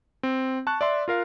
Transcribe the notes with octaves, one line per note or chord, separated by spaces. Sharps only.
C4
A5 C#6 F#6
D5 E5 C6
F4 A#4 F5